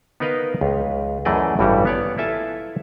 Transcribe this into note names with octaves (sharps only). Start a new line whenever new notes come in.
B3 D#4 A#4 B4 D#5 F5
C#2
F#2 E3 A3 G#4 D5 D#5
A1 G2 E3 G3 F#4 G4
B3 C#5 D5
E4 F4 A4 E5 G#5 A5